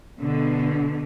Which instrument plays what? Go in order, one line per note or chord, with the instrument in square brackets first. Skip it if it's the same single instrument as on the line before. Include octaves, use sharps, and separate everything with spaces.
[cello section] B2 D3